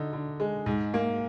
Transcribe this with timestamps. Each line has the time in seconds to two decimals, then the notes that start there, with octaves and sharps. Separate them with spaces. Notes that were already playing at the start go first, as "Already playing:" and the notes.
Already playing: D3 D#4
0.13 D3
0.40 G#3
0.66 G#2
0.94 A#3